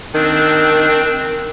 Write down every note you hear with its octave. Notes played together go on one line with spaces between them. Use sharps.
D#3 C4 D4